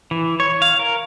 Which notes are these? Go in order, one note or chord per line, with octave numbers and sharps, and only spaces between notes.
E3
C#5
F5
A#4